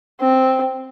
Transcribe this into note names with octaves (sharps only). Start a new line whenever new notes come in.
C4